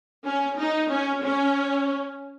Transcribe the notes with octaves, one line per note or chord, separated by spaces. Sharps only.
C#4
D#4
C#4
C#4